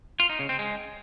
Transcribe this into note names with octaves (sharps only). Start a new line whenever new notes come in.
F4
D#4
C#3
C4
G#3